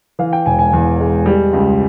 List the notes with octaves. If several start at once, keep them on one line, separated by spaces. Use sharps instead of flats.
E3 F5
G5
E1 G#5
G#5
E2
G#3
G3
C#2